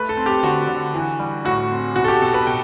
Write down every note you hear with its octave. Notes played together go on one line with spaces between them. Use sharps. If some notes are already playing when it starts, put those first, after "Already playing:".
Already playing: A3 B4
A4
C4
G4
D3 F#4
D3
E3
G3
A2 F#4
C4
B2 F#4
A4
G4
B2 A4
B4
B2 G5